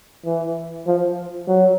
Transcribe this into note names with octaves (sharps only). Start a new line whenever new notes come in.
E3
F3
F#3